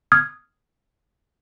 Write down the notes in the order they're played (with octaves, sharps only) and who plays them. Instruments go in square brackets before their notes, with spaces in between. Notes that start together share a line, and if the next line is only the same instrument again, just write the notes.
[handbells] D#6 F6 G#6